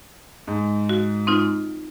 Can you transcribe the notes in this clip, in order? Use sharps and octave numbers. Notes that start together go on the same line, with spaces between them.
G#2
F#4
C4 D#4 F4